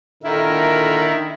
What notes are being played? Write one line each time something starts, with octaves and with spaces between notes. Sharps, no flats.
A#2 D3 D#3 E4 A#4 E5